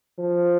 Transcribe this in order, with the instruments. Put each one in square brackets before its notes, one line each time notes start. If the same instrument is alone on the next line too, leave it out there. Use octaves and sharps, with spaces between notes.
[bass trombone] F3